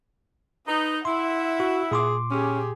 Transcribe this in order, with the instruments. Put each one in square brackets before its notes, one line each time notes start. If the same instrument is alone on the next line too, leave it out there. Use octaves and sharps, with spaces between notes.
[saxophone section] D#4 [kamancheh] B4
[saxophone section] E4 [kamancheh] E5 F#5 [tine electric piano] C6
[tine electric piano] F#4
[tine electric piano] A#2 C6 D6 [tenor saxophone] G#4
[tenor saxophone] C#4 [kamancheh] G4 G#4